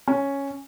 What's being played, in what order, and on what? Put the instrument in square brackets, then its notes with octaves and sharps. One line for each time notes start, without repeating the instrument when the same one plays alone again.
[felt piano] C#4